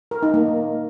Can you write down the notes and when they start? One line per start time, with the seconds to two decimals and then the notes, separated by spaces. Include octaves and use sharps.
0.11 A#4
0.23 D#4
0.34 A#3